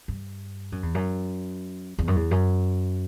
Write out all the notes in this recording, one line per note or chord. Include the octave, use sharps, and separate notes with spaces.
G2
F#2
E2
F#2
E2
F#2
E2
F#2